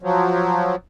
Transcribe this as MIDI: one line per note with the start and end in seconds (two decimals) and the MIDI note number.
0.02 0.76 53
0.02 0.76 54